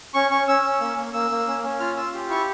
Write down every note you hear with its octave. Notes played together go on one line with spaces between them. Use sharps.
C#4 C#6
C#4 C#6
C#4 E6
C#4
A#3
A#3
A#3 E6
A#3
C#4
C#4
F4 F6
F4 E6
G4
E4 C#6